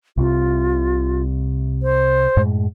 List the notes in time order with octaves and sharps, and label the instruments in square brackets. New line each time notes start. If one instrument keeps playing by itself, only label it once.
[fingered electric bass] C2 C3 [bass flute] F4
[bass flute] C5
[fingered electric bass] F#2 A2 G#3